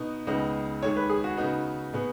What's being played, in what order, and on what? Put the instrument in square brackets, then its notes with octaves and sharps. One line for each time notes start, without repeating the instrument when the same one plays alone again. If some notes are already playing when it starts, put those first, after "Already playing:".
Already playing: [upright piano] B2 B3 D#4
[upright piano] C#2 C#3 B3 D#4 [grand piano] D#5
[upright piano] D#2 D#3 G#3 [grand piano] C#5
[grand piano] B4
G#4
F#4
[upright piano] C#3 B3 F#4 B4 [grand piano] D#4
[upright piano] B2 B3 G#4